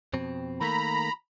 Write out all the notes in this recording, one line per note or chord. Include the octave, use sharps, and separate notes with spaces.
F2 B2 C4
D#3 A3 A#3 A#5 B5